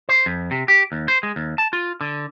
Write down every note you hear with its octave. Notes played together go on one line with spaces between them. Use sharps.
C5
F2
C3
G4
D#2
C5
G#3
D#2
A5
F4
D3